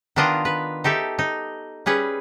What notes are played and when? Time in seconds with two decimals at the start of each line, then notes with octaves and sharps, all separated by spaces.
0.16 D#3 B3 D4 F4 D#5
0.45 B4
0.84 D#4 G4 A4 E5
1.19 D#4
1.86 G3 C#4 G#4 B4